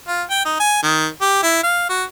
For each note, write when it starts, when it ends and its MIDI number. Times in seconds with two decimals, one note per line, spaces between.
0.08 0.23 65
0.30 0.42 79
0.45 0.55 63
0.60 0.81 80
0.83 1.07 51
1.21 1.38 67
1.43 1.62 64
1.64 1.87 77
1.89 2.04 66